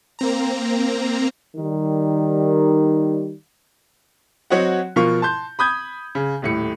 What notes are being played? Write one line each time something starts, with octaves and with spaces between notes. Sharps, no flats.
A#3 C4 A#5
D#3 G3
F#3 C4 F#4 C#5 D#5 F#5
B2 F3 F4 A#4 C#6
A5 C6 G6
B5 D#6 G6 G#6
C#3
D#1 A2 C#7